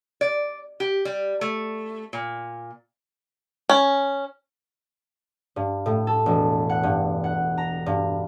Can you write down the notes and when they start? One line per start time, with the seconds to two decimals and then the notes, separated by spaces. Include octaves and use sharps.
0.21 D5
0.80 G4
1.05 G3
1.41 A3
2.13 A#2
3.70 C#4
5.56 G2
5.86 A2
6.07 A4
6.26 E1
6.69 F#5
6.83 G2
7.24 F#5
7.58 A#5
7.86 G2